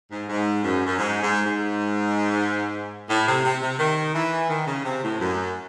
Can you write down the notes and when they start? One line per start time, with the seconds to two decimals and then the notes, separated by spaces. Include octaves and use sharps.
0.11 G#2
0.29 G#2
0.63 F#2
0.86 F#2
0.98 G#2
1.22 G#2
1.45 G#2
3.09 A2
3.27 C3
3.45 C3
3.62 C3
3.79 D#3
4.15 E3
4.49 D#3
4.67 C#3
4.85 C3
5.03 A2
5.20 F#2